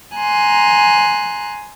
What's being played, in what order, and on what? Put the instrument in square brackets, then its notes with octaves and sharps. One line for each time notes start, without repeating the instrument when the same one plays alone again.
[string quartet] G#5 A#5 C6 F#6